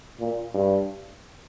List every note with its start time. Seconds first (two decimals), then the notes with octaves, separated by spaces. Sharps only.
0.20 A#2
0.54 G2